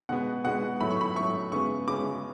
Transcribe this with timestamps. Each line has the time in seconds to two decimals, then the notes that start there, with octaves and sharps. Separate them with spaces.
0.09 B2 G#3 B3 F#5
0.44 B2 G#3 B3 F#5
0.80 A2 F#3 A3 B5
0.91 C#6
1.01 B5
1.16 A2 F#3 A3 C#6
1.52 C#3 G#3 B3 C#6
1.88 C#3 G#3 B3 D6